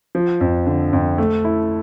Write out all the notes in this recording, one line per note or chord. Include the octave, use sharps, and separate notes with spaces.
F3
F2
D3
F2
A3
E4